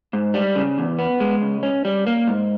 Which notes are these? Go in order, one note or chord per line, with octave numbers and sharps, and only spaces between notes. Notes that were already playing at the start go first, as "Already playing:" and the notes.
G#2
G3
C#3
E2
B3
G#3
C#2
C#4
G3
A#3
G#2